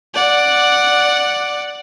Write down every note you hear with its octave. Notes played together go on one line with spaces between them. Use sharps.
D5 F#5